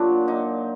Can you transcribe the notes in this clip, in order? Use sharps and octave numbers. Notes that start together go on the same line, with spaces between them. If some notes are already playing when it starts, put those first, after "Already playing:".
Already playing: A#2 F#3 D4
D#4